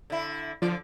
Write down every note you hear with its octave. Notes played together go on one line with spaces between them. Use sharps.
D3 E4
D3 F3 D5